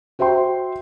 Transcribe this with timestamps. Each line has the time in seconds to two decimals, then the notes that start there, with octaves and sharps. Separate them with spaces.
0.19 F#4 C5 E5 G5 C6